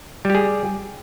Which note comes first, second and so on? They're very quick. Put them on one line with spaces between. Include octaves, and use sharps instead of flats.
G3 G4 G#4